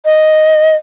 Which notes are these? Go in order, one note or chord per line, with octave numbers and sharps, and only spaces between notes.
D#5